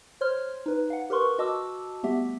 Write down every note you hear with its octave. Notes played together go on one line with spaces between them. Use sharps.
C5 C#5 C6 F6
D#4 B4
F5 F#5
G4 A#4 B4 C6 C#6
F#4 D#5 A5 D6 E6
G3 A3 B3 G4 E5